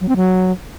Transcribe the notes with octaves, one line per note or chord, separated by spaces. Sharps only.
F#3
C4
F#3